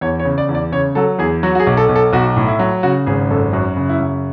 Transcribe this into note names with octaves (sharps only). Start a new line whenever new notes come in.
E2 C#5
C#5
C#3
D5
E2
D5
C#3 C#5
F#3 A4
E2 G#4
F#3 F#4
F#4
G#4
B1
A4
B1
A4
B1 F#4
A2
E4
F#3
C#3 F#4
G#1 G#4
F#2 A4
F#2 F#4
C#3
E4
F#2